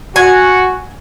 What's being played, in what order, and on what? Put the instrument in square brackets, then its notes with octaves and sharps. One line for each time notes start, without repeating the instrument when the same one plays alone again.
[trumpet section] F#4 [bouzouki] G#5